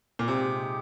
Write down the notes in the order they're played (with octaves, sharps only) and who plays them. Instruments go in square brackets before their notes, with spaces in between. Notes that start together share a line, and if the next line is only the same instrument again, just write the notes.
[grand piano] A#2
[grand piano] C3 [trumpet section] G#3 D#4 G4